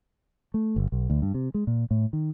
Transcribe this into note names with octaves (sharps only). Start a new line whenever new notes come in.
A3
G1
B1
D2
G2
C3
G#3
A#2
A2
D#3